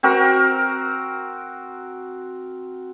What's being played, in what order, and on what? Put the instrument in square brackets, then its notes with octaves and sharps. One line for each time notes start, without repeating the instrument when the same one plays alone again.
[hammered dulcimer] C4 F#4 A#4